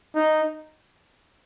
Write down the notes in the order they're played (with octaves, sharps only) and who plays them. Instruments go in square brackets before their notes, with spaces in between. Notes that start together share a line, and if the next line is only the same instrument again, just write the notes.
[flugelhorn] D#4